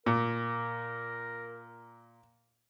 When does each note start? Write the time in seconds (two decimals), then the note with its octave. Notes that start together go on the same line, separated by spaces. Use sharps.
0.06 A#2 A#4